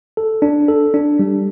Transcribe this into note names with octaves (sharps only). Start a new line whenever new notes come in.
A4
D4
A4
D4
G3